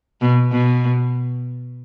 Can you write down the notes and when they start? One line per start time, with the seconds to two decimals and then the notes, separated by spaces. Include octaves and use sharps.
0.21 B2
0.52 B2